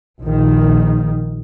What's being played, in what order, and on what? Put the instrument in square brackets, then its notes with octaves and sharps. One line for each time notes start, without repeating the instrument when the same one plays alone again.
[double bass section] A#1 D#3